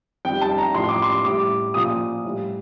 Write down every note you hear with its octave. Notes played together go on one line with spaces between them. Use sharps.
F2 D#3 G3 G5
A5
A#5
A2 F3 C6
D6
C6
A2 G3 D6
A#2 F3 D#6
A2 G3